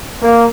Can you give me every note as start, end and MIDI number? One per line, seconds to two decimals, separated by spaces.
0.22 0.45 58